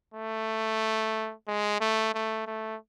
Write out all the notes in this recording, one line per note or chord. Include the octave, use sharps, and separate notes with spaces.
A3
G#3
A3
A3
A3